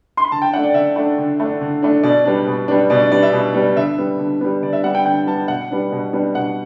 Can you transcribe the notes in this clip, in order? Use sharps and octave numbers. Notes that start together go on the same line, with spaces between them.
C6
B5
D3 A5
G5
A3 D4 F#5
D5
D3 E5
A3 D4
D3
A3 D4
D3
A3 D4
B2 D5
G3 B3 D4
B2
G3 B3 D4
B2 D5
D5
G3 B3 D4 D5
E5
B2
G3 B3 D4
D3 E5
G3 B3
D3
G3 B3
D3 D5
E5
G3 B3 F#5
G5
D3 G5
G3 B3 A5
B2 F#5
G3 B3 D4
B2
G3 B3 D4
B2 F#5